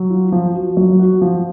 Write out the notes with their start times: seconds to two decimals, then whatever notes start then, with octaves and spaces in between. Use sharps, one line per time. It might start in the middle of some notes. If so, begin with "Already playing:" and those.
Already playing: F#3
0.10 F4
0.32 F3
0.54 F#4
0.77 F#3
0.99 F#4
1.22 F3